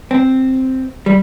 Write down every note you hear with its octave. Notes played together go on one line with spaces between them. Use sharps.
C4
G3